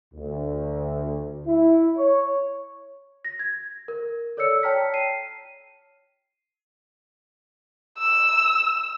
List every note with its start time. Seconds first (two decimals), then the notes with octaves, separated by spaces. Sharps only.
0.14 D2
1.46 E4
1.97 C#5
3.25 A#6
3.39 G#6
3.88 A#4
4.37 A4 C#5 D5 E6 C#7
4.63 C#5 G5 A5 A#5 F6 B6
4.94 C7 D#7
7.98 E6